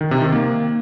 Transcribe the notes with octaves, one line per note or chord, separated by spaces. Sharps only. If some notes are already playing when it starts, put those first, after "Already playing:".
D#3
C3
D#3
A#3